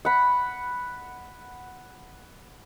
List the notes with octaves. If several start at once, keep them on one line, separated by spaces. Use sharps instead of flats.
F#5 B5